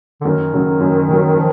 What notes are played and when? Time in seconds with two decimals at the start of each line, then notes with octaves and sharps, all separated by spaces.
0.21 D3
0.25 F#2 D#3
0.53 C#3 F#3
0.80 F#2
1.08 C#3 F#3
1.36 F3